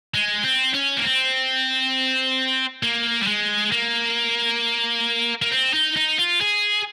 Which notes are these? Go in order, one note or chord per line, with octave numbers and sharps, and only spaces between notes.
G#3
C4
C#4
A#3
C4
A#3
G3
G#3
A#3
A#3
C4
D#4
D#4
F4
G#4